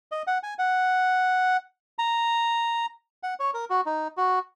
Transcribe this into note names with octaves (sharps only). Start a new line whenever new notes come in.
D#5
F#5
G#5
F#5
A#5
F#5
C#5
A#4
F#4
D#4
F#4